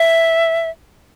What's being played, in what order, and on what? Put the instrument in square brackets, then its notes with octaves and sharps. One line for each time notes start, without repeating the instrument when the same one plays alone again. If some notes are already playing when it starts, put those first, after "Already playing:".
Already playing: [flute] E5